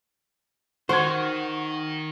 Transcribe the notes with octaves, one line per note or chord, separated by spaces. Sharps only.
D#3 F#4 C5 C#6 G#6